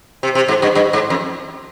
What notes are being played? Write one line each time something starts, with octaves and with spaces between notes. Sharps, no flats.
C3
C3
G#2
G2
G2
G#2
F2